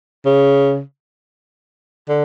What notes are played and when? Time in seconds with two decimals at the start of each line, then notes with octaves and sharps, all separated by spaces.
0.25 C#3
2.09 D3